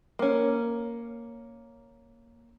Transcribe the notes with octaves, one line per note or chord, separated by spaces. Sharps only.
A#3 C#4